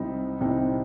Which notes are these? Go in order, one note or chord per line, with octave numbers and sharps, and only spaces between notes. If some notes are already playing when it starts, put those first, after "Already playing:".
Already playing: C2 C3 G3 C4 D#4
C2 C3 G3 C4 D#4